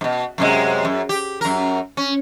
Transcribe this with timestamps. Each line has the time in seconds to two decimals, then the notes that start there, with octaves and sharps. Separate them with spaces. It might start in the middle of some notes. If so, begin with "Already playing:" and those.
0.01 G#2 B2
0.38 F#2 C3 G#3
0.85 F#2
1.09 G4
1.41 F#2 A#4
1.97 C#4